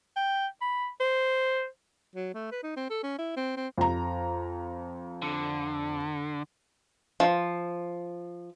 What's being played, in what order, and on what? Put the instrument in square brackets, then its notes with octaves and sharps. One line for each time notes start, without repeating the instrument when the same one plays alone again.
[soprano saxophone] G5
B5
C5
[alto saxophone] F#3
A3
B4
D#4
C4
A4
C#4
E4
C4
C4
[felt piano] F2 A#5
[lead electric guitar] D3
[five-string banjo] F3